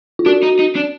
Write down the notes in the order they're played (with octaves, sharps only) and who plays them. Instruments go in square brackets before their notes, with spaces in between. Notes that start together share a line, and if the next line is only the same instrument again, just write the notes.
[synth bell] F4
[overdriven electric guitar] D4 [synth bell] F#4
[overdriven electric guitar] D#4
D#4
D4